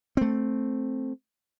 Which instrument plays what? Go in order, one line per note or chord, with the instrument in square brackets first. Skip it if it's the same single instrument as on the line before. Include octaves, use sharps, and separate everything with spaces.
[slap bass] A3 C4